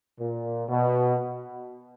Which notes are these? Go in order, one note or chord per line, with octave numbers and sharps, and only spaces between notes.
A#2
B2